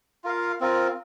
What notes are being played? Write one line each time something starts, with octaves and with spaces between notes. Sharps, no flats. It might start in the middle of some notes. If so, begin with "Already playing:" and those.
F4 A#4 F5
C4 F4 A#4